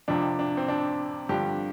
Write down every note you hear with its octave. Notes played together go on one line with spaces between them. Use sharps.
F2 C3 F3 D4
D4
C4
D4
G2 D3 F3 G4